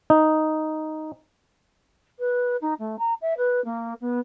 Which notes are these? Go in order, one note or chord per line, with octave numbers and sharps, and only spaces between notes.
D#4
B4
D#4
A3
A#5
E5
B4
A#3
B3